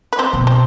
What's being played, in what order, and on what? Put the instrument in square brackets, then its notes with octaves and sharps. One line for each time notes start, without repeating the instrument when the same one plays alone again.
[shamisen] B4
C4 C5
[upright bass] B2
[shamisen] C4 C5